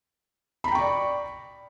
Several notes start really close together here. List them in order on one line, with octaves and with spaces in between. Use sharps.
B5 A#5 G5 C#6 D5